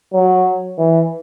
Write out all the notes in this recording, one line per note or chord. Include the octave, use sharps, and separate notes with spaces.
F#3
E3